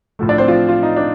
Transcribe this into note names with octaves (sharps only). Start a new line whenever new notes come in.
A2 F3 A3
D4 D5
C4 C5
F3 F4
F4
D#4
D4